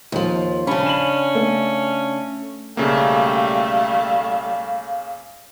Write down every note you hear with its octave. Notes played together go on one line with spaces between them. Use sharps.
D#2 F3
C#3 C#4 D4 B5
E7 F#7
A3
B1 C#3 G3 A3 A#3 F5